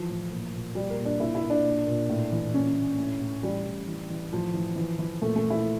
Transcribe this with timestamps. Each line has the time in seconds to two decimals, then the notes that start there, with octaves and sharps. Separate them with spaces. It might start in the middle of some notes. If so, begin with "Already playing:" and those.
Already playing: E3 F3
0.09 A2
0.32 A#2
0.53 A#2
0.75 A#2 G3
0.90 A#3
0.99 A#2
1.05 D4
1.20 A#2 E4
1.35 E4
1.43 A#2
1.50 D4
1.64 A#2
1.87 A#2
2.09 A2
2.32 E3
2.54 A#2 C#4
2.76 A#2
2.98 A2
3.20 A2
3.43 E3 G3
3.66 A2
3.88 E3
4.10 E3
4.33 A2 F3
4.54 E3
4.76 E3
4.99 E3
5.21 A#2 A3
5.36 A3
5.44 A#2
5.50 E4